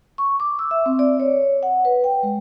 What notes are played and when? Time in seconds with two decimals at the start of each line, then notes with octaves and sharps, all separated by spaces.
0.18 C#6
0.40 D6
0.59 E6
0.71 E5
0.86 C4
0.99 D5
1.20 C#5
1.63 F#5
1.85 B4
2.04 G5
2.23 G#3